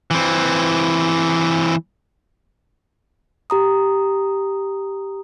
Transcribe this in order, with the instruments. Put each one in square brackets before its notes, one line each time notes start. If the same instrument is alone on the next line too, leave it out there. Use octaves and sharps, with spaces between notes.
[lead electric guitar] E3 C4
[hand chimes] G4 A#5 D#6